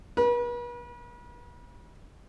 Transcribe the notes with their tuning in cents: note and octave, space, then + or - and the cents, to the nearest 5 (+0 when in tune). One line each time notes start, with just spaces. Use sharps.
B4 -40